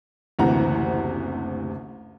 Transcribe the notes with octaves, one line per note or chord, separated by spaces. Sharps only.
F#1 D2 C3 E3 F#5 A#5